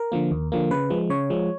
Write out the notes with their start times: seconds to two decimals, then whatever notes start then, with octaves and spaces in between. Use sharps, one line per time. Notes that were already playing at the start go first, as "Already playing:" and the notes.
Already playing: A#4
0.12 D3 F3 A#3
0.31 D#2
0.52 D3 F3 A#3
0.71 C#3 B4
0.90 F3 G#3
1.10 C#3 C#5
1.30 F3 G#3